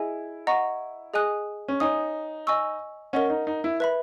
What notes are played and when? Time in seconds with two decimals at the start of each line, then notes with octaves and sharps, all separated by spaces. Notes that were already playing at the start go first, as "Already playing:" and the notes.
Already playing: E4 G#4 D#5 G#5
0.47 D#5 F#5 A#5 C#6
1.14 G#4 D#5 G#5 D#6 F#6
1.68 C#4
1.80 D#4 C#5 G#5 D#6
2.47 D#5 G#5 C#6 E6
3.13 C#4 A#4 D#5 F#5
3.30 D#4
3.47 D#4
3.64 E4
3.80 B4 E5 B5